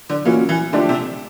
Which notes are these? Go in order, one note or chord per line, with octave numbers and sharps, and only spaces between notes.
D3
A#2 E3 F#3 A#3 C#4 F#4
E3
D3 F3 A3 D4 G4
C3